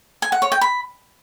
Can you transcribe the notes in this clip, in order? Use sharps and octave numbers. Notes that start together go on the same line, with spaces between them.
G#5
F#5
C#5
G5
B5